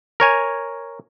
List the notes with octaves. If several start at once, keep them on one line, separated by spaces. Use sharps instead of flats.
A#4 C#5 G#5